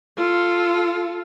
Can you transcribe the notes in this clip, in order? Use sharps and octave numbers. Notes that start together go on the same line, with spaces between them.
F4 A4